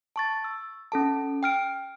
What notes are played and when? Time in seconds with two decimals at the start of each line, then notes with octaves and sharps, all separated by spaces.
0.16 A5 C#6 A6
0.44 E6
0.92 C#4 A4 A5
1.43 G5 F6 D7